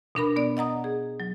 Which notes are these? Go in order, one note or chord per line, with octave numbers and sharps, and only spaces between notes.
B2 D4 A#4 B5
B3 D5
D#5 F#5 A#5 D#6
G#4
F#3